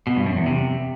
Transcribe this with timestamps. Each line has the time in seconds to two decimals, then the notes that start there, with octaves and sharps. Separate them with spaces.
0.07 B2
0.17 G2
0.26 F#2
0.36 E2
0.46 C3